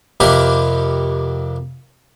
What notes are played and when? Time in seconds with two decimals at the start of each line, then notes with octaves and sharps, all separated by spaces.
0.20 F2 C3 A#3 G4 B4